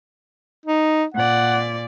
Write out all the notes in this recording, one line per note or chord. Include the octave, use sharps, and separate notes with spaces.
D#4
A#2 D5 F#5